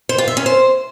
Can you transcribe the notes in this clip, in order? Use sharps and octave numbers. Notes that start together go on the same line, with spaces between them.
C5
F4
E5
C#4
C5